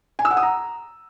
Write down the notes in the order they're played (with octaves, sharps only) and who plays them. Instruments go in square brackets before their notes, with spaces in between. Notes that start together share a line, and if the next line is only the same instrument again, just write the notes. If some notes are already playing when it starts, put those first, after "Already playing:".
[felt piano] G#5
E6
F#5
D#6
A#5